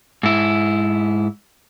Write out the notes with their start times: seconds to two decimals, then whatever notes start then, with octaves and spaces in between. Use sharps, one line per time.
0.23 G#2 E4